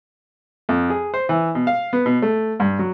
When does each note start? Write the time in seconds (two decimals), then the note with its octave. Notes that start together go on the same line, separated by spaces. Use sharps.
0.69 F2
0.90 G#4
1.14 C5
1.29 E3
1.55 B2
1.67 F5
1.93 B3
2.06 B2
2.22 A3
2.60 G2
2.79 F#3